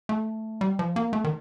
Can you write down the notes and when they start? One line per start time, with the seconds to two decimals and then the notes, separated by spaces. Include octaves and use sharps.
0.09 A3
0.61 G3
0.79 F3
0.96 A#3
1.13 A3
1.24 D#3